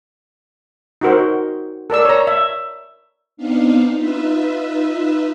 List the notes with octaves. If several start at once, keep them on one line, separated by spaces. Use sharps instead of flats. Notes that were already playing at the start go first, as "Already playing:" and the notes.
D#4 F#4 A#4 C5
A4 A#4 D5 E6
C#5 A#5
E5
B3 C4 D4 D#4 F5
D#4 F4 B4 E5